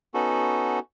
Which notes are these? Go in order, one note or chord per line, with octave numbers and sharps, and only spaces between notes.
B3 C#4 D#4 F#4 A4